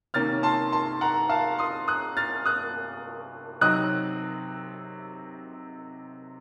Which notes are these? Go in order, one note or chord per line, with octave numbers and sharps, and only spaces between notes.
C3 D#3 A#3 C#4 F6 A6
A5 C6
A5 C6
F#5 A#5
F5 A5
C6 D#6
D#6 F#6
F6 A6
D#6 F#6
C3 F#3 C4 D#4 D#6 F#6